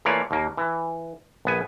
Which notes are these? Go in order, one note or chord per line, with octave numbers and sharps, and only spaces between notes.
E3 A3 A#3 F4 C#5 D5
D#2 A#3
E3
A#1 B3 G#5